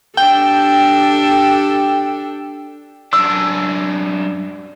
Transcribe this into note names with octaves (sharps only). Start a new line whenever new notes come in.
D4 G4 A4 G5
F#2 D4 E6